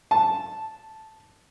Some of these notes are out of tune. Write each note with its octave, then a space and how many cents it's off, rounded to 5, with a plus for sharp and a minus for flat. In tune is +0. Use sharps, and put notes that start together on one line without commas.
A5 -5